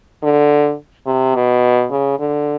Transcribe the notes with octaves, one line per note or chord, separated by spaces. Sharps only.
D3
C3
B2
C#3
D3